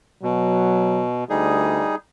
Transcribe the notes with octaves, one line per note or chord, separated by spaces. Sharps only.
B2 F#3
D2 G3 D#4 G#4